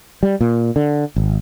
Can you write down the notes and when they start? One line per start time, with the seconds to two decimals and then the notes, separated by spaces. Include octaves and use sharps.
0.23 G3
0.41 A#2
0.76 D3
1.16 G#1